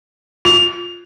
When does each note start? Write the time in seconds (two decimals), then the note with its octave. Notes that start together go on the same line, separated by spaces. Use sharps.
0.45 F4 F7